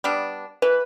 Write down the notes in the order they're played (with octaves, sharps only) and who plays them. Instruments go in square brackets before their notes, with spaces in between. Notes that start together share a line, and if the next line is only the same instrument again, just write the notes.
[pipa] G3 B3 D4
[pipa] E3 [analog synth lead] B4